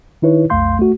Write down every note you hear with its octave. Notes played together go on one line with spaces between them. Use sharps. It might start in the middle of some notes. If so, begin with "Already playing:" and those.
D#3 D#4 E4 B4 C#5
B1 F2 A3 F5 C6 G6
A3 F#4